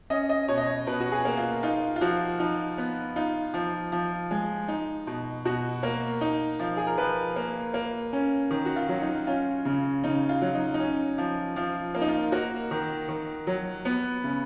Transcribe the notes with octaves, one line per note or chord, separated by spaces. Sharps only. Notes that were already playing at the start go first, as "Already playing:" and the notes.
C#4 D#5
D#5
B2 C#5
D#5
C#5
B2 B4
F#4
G#4
A#3
F4
D#4 F4
F4
F3 F#4
F3 D#4
B3
D#4 F4
F3
F3
G#3
D#4
B2
B2 F#4
A#3
D#4
F3 F4
G#4
A#4
F3 B4
A#3
A#3
C#4
D#3
F#4
F4
F#3
D#4
C#4 F4
C#3
C#3 D#4
F4
F#3
D#4
D#4
C#4
F3
F3 F4
A#3 F4
D#4
F4
A#3 F#4
D#3
D#3
F#3
B3
C#3